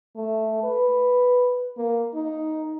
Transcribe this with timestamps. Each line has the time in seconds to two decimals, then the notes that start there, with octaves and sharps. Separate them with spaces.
0.16 A3
0.63 B4
1.77 A#3
2.15 D#4